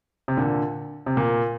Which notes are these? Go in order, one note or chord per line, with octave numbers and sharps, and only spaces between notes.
C3
A#2 D3
C3
A#2